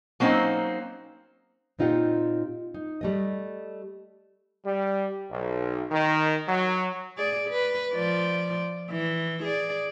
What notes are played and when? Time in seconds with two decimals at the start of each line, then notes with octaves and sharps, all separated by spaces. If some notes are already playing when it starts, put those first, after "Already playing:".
0.20 F#3 A#3 C4 C#4 D#4
1.79 A#2 C4 D#4 F4 G4 F#5
2.74 D#4
3.01 G3 A3 D#5
4.66 G3
5.31 B1
5.92 D#3
6.48 F#3
7.18 G#4 D5
7.49 B4
7.93 F3 D5
8.90 E3
9.44 G#4 D5